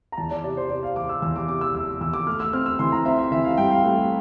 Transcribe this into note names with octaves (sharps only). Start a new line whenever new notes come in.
A#5
E2 A5
D5
C3 D5
C5
C3 D5
F5
E2 D6
E6
E2 E6
D6
C3 D6
E6
F1 E6
E2 E6
D6
A3 F6
E6
C4 F6
E6
E3 C6
A#5
C4 E5
E5
E3 E5
F5
G2 G5
F5
A3